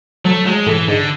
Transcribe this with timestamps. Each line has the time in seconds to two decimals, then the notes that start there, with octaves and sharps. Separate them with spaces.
0.25 F#3 A3
0.46 F#3 G#3
0.67 A2 E3
0.88 G#2 D3